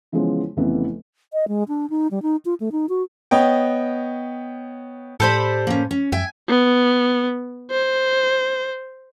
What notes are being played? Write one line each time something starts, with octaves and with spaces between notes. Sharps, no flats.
C#3 E3 F3 G#3 B3 C#4
F1 F2 C#3 E3 B3 B4
D#5
G#3
D4
D#4
G3
D#4
F4
A3
D#4
F#4
B3 C#5 D#5 G5
A2 G4 A4 C5 D5 B5
A#3 C#4
C#4
F#2 E5 G5 G#5
B3
C5